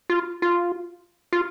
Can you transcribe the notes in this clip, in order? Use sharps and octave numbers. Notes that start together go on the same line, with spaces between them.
F4
F4
F4